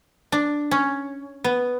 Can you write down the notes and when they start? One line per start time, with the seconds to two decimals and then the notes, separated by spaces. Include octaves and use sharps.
0.32 D4
0.71 C#4
1.44 B3